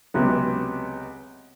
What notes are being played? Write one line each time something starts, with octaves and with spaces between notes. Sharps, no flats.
C#2 C3 F#3 B3